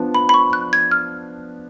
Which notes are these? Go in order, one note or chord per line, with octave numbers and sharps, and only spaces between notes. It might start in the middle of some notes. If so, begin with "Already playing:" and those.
Already playing: F3 B3 D4
B5
B5
C#6
F#6
G#6
F6